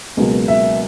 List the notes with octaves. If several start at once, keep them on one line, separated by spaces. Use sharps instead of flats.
C#2 B2 F#3 A#3
E5